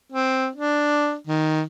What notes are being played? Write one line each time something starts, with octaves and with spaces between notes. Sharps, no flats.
C4
D4
D#3